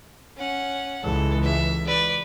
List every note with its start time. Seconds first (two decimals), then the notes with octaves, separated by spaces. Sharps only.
0.37 C#4 F#5
1.04 C#2 E3 G#3 A4
1.43 E5
1.87 B4 D5